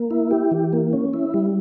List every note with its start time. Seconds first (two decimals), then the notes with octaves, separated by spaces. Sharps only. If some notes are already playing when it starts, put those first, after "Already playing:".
Already playing: A#3
0.11 E4
0.31 G4
0.51 E3
0.73 A#3
0.93 C#4
1.14 E4
1.34 G3